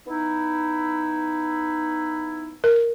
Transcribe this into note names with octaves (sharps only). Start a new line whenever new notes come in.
B3 D#4 E4
A#4